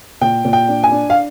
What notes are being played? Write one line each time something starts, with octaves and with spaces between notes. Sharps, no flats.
A#2 G5
A#2
G5
D4
G#5
D4
F5